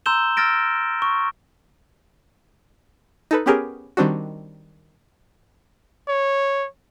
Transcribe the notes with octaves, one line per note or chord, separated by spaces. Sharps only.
A#5 C6 E6 G6 E7 G7
E6 F6 A6 A#6 D7
C#6
D#4 A4 B4
B3 C#4 G4 G#4 A#4
D#3 G3 C4 D4 F#4
C#5